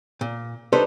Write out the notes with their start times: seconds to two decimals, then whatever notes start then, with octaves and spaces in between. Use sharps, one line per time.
0.21 A#2
0.73 G3 D4 D#4 A4 B4 C5